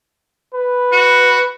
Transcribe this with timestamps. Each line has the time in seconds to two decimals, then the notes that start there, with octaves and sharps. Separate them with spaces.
0.54 B4
0.92 F#4